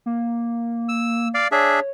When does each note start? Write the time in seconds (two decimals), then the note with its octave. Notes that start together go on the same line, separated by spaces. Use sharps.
0.06 A#3
0.89 E6
1.34 D5 F5
1.52 D4 G#4 C#5 E5